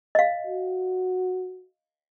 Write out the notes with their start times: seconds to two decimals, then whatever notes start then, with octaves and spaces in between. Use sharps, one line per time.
0.15 D#5 F5
0.47 F#4